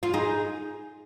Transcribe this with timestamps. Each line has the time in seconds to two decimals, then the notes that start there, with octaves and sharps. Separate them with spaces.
0.03 F4
0.14 D#4 G#4